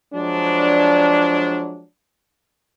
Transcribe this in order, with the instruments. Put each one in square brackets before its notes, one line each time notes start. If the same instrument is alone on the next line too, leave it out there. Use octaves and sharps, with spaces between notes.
[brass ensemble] F3 F#3 G#3 D4